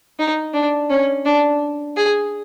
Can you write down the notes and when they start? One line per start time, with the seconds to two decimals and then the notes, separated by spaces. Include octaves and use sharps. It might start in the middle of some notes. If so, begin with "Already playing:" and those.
0.19 D#4
0.53 D4
0.90 C#4
1.25 D4
1.97 G#4